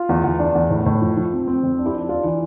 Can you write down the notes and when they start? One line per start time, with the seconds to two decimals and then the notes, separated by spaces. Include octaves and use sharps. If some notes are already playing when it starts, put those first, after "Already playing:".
Already playing: F4
0.09 E2
0.24 E2
0.39 D4
0.55 E2
0.70 A2
0.86 A2
1.02 F3
1.17 F3
1.33 C4
1.48 C4
1.63 F2
1.79 D4
1.86 E4 G4
1.94 D4
2.09 D4 F4
2.24 E3